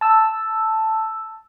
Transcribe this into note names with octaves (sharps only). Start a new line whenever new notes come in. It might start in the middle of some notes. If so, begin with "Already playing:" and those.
A5 E6